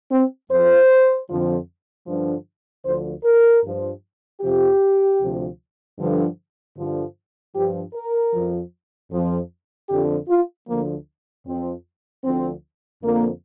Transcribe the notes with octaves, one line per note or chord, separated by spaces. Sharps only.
C4
F2 F3 C5
F2 D3 F3
G2 D3 F3
D2 D3 F3 C5
A#4
G2 F3
F2 C3 F3 G4
D2 C3 F3
G2 D3 F3
G2 D3 F3
G2 F3 G4
A#4
F2 F3
F2 F3
F2 D3 F3 G4
F4
D2 D3 F3 A#3
F2 F3 C4
D2 D3 F3 C4
F2 D3 F3 A#3